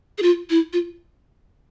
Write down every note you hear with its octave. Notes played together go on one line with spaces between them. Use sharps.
G#4
F4
E4
F4